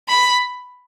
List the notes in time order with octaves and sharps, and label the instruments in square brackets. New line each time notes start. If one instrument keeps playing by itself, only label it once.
[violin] B5